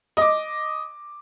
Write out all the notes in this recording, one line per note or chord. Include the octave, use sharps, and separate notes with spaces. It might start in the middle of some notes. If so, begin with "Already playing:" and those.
D#5 D6